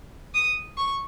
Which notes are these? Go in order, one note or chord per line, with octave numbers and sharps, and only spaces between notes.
D#6
C#6